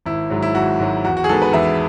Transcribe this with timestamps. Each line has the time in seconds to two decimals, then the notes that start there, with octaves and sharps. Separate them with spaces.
0.06 G#1 E4
0.30 G#2 F#3
0.42 E4
0.55 G#1 F#4
0.80 G#2 F#3
1.04 E2 F#4
1.17 F#4
1.24 G#4
1.29 D#3 G#3 B3 A4
1.42 B4
1.53 E2 E5